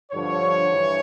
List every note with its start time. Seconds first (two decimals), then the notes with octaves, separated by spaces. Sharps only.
0.12 G2 D3 F3 C#5
0.69 G2 E3